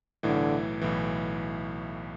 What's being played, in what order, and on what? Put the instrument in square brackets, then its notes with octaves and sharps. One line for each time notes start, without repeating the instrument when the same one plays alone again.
[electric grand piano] B1 A2 E3 [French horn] D3
[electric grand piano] B1 A2 E3